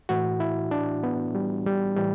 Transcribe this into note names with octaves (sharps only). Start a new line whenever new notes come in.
A2 E3 F#4
E4
D4
B3
G3
G3
A2 E3 G3